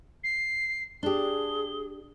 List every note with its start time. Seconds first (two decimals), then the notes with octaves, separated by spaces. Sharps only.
0.24 C7
1.03 D4 G4 G#4 G7